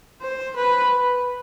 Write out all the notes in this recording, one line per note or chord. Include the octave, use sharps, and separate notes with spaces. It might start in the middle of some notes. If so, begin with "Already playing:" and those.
C5
B4